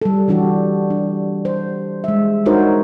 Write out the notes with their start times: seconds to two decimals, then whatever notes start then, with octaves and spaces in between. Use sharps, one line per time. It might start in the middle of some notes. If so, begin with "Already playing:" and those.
0.02 G3 A4
0.28 E3 G3 D4 F#4 G4
0.90 D4
1.45 C5
2.04 G#3 E5
2.45 D4 D#4 F#4 A#4 C5 C#5